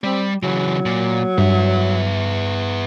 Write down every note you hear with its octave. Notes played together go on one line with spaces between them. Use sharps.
G3 C4
C#3 E3 F#3
A#2
G2 B3 E5